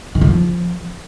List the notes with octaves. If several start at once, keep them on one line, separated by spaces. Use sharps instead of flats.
D#3
D3
F3